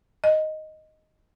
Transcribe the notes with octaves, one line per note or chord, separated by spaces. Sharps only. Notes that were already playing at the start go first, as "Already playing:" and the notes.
D#5